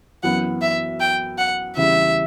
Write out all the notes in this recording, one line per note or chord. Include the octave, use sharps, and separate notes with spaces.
F#2 E3 B3 F#5
E5
G5
F#5
E2 C#3 G3 E5